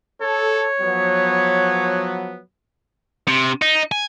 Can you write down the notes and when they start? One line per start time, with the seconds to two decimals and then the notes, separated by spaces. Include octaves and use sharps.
0.22 A4 C#5
0.80 F3 F#3 B3
3.28 C3
3.62 D#4
3.92 G#5